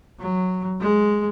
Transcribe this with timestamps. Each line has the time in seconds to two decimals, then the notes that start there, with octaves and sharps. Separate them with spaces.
0.20 F#3
0.81 G#3